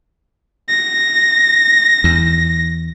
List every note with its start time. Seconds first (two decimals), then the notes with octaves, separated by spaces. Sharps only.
0.69 A#6
2.04 E2